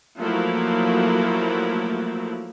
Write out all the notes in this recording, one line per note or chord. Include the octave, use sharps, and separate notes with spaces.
F3 F#3 A3 A#3 E4